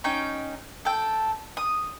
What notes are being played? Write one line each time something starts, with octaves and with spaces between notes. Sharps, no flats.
C#4 D#4 G5
A4 G5
D#6